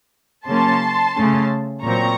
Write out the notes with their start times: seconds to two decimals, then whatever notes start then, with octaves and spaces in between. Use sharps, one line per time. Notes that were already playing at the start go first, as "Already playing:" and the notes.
0.47 C#3 F#3 A#3 C#4 A5 C6
1.16 C#3 A3 C#4
1.83 A#2 F#3 C4 A#5 C#6